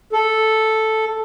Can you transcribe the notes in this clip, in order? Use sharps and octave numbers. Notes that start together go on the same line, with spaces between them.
A4